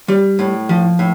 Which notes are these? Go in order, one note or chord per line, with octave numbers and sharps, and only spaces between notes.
G3
A2
F3
A2